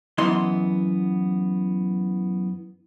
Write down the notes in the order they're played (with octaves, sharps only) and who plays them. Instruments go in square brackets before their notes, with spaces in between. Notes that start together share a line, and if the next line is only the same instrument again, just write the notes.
[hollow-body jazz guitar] F#2 E3 B3 D#5 C6